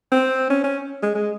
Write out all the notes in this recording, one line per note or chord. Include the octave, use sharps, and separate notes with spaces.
C4
C#4
C#4
G#3
G#3